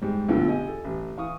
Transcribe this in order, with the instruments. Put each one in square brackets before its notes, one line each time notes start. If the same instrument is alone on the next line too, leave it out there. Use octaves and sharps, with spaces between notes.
[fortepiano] G#2 G3
B1 G2 D3 F3 F#3 A3
G4 D#5 G#5
A4
A1
E3 F5 C#6 D#6